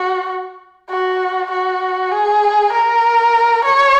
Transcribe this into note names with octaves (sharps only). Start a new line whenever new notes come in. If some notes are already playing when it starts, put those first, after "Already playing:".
Already playing: F#4
F#4
F#4
G#4
A#4
C#5